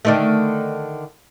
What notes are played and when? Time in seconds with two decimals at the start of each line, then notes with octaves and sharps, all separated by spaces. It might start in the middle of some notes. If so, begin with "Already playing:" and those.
0.05 D3 D#3 A3